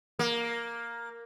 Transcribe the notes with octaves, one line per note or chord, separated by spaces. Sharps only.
A#3